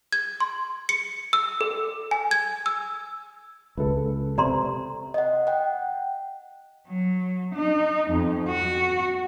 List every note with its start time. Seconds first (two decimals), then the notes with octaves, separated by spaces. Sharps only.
0.12 G#6
0.40 C6
0.89 C#7
1.33 E6
1.61 A4
2.11 G#5
2.31 G#6
2.66 E6
3.78 C#2 A4 B4
4.38 C3 D5 A#5 C6
5.14 D#5 F#5
5.47 F#5 G5
6.88 F#3
7.55 D#4
8.10 F2
8.49 F#4